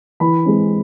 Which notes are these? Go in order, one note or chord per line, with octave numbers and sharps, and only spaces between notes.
E3 B5
G#3 C4